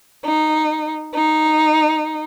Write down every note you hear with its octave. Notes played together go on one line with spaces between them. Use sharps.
D#4
D#4